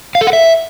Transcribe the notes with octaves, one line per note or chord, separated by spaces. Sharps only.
F5
A4
F#5
E5